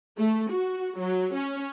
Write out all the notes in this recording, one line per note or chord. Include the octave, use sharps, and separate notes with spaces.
A3
F#4
F#3
C#4